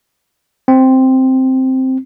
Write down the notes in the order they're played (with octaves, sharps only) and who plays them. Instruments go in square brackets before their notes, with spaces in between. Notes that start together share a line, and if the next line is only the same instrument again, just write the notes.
[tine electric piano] C4